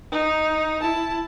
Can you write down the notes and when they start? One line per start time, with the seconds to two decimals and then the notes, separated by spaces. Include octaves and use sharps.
0.11 D#4
0.80 E4 A5